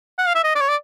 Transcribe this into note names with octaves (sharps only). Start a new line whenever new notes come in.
F#5
F5
E5
D#5
D5
C#5
D5